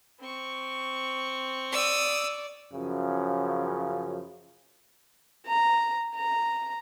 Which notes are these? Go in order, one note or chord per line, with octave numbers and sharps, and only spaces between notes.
C4 C#6
D5 D#6 E6
F#2 C#3 F3
A#5
A#5